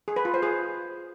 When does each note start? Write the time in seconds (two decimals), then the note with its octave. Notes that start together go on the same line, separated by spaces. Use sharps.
0.08 G#4
0.16 B4
0.25 F4
0.34 C5
0.43 G#4